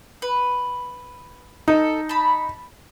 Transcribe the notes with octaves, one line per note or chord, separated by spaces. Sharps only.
B4
D#4 A4
A5 B5